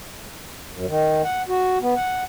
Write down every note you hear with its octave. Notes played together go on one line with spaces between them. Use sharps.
F#2
D#3
F#5
F#4
B3
F#5